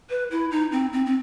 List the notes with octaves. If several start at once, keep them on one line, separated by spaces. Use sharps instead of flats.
B4
E4
D#4
C4
C4
C4